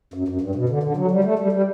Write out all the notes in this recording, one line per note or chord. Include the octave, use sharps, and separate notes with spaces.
F#2
F#2
G2
B2
D3
D3
F#3
G3
A3
G3
G3